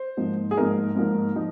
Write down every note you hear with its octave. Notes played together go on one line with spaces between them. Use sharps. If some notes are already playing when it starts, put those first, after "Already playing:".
Already playing: C5
G#2 F3 A#3 D#4
G#4
G#2 F3 A#3 D#4 A#4
G#2 F3 A#3 D#4
F3 D#4